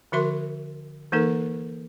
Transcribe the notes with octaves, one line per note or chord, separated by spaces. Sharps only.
D3 F3 F#4 A#4 E5 C6
E3 A#3 D#4 A4 A#4